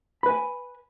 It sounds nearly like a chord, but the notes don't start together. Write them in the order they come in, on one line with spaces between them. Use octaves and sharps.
B5 B4 G#5